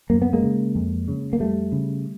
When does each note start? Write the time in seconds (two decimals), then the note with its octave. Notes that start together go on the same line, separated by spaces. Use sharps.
0.10 F#2 A#3
0.22 B3
0.33 G#3 A#3
0.43 C#3
0.75 F2
1.08 C#3
1.33 A#3
1.40 F2 G3 A3
1.72 C#3